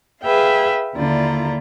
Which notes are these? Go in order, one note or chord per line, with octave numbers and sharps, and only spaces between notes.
G#4 B4 E5 F5 G5
D#2 D3 E4 F4 D5 A#5